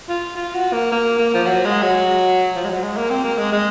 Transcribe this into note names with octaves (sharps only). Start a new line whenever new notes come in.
F4
F4
F#4
A#3
A#3
A#3
F3
F#3
G#3
F#3
F3
G#3
F#3
G#3
A#3
C4
A#3
G#3
G#3